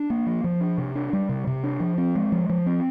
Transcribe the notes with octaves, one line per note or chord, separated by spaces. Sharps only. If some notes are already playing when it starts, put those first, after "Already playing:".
Already playing: D4
A#3
F3
F3
D4
C3
D4
G3
C3
C3
D4
F3
C4
G#3
F3
F3
C4